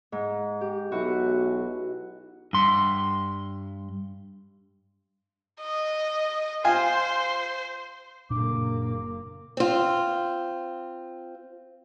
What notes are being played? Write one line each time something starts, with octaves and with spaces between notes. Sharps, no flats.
G#2
G4
B1 E4 F#4
G2 C6
D#5
F4 C5 G#5
F#1 A#2 A#3 D4 D6
C4 F4